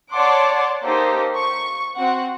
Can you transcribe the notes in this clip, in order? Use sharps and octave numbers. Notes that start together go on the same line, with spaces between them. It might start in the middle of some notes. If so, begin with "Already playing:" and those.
C#5 D5 F#5 A5 C6 D6
A#3 D#4 G4 A4 C5
C#6
C4 F#4 F#5